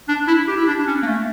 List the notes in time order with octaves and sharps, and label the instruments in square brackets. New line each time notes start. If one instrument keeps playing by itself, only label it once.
[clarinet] D4
E4
G4
E4
D4
D4
C#4
A#3
A3